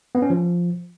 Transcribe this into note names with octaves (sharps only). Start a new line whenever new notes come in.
B3
C#4
F3